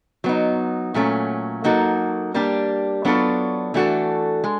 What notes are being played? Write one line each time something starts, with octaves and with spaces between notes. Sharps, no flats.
F#3 B3 D#4
A#2 F#3 A3 C#4
F#3 A#3 D#4 F#4 A4
G3 A#3 D4 G4
F#3 B3 D4 F4 A4
E3 A3 D4 F#4 A4
G#3